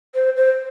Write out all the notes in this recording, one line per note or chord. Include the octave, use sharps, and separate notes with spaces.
C5
C5